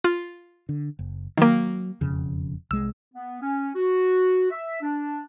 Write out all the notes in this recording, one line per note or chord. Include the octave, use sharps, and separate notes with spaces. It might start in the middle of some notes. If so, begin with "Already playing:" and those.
F4
D3
F#1
D#3 F#3 A#3
E1 F2 C#3
C2 G#3 E6
B3
C#4
F#4
E5
D4